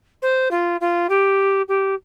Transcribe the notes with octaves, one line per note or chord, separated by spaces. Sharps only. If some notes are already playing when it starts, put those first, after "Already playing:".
C5
F4
F4
G4
G4